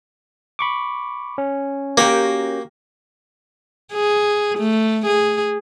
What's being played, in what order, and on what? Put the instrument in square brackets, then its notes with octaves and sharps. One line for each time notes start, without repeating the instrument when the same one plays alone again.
[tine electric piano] B5 C#6 D6
C#4
[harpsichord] A#3 [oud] F#4 G4 A#4
[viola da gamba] G#4
A3
G#4